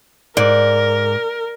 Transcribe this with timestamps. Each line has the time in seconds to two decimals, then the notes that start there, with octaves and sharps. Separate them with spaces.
0.37 G#2 A#4 D5